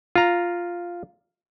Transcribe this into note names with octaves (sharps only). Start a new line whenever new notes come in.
F4 A#5